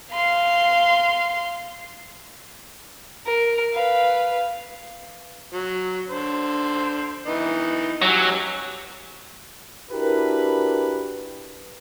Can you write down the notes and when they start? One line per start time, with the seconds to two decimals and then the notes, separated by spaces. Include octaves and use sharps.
0.12 F5 C6
3.26 A#4
3.73 B4 F5
5.53 F#3
6.10 D3 C5
7.27 E3 B3 D#4
8.02 F#3 C#4 G4 E6
9.91 D4 E4 F#4 G4 A#4 B4